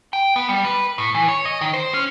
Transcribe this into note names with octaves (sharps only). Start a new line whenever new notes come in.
G5
B3
G3
B4
A2
E3
C#5
D#5
D#3
C5
C#4